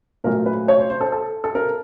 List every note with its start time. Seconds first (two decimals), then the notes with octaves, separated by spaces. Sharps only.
0.24 A#2 F#3 A3 A#4
0.46 B4
0.68 C#5
0.79 C5
0.90 C5
1.01 A4
1.12 A4
1.44 A4
1.55 A#4